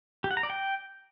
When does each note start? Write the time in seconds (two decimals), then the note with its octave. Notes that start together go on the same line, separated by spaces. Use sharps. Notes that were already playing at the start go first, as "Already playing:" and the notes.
0.24 G4
0.31 F#5
0.37 A#5
0.43 D5
0.50 G5